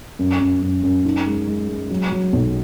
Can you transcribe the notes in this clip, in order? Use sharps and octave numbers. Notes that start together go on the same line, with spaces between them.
F#2
F#2
F#2
F#2
D#4
G#3
G#3
G#3
F#3
F#3
B1